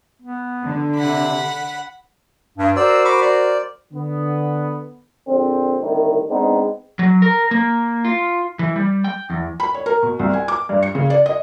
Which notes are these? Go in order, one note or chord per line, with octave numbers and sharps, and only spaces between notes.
B3
D3
C3 F#5 B5
G2
F#4 A#4 C5 D5 E6
B5 C#6 D6
D5
D3 B3
A#1 D3 C4
C2 A2 D3 D#3
G#3 B3 C4 D4 D#4
F#3
A#4
A#3
F4
E3
G3
G5
E2
B5
C#5
A#4
B2
C2
G#5
D6
G2
C#7
C#3
D5
D#5